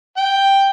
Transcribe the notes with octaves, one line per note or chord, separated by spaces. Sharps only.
G5